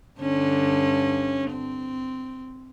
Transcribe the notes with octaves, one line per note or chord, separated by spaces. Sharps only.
G2 D3 C#4
C4